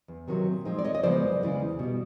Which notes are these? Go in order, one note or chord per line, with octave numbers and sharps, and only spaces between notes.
E2
C3 D#3 F#3
A#2
F3 G#3 C4 D#4
D5
D#2 C#5 D#5
D#5
C#3 F3 G#3 B3 C5 D5
F#2
C#3 E3 G#3 B3
E2
B2 G3